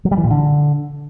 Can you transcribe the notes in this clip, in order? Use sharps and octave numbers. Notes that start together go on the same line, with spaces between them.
F#3
G3
E3
A#2
D3